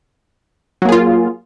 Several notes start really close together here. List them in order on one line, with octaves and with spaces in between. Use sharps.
F#3 A#3 G#4 F4